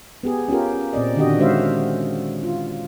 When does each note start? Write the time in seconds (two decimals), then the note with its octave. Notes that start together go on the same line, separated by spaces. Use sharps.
0.23 B3 G4 G#4
0.48 C#4 F4 G4 A#4
0.93 A#2 C4 D5 D#5
1.16 D3 D#3 D4 F#4 G4 D#5
1.39 G#3 C#4 F#4 C5 E5 F5
2.43 F4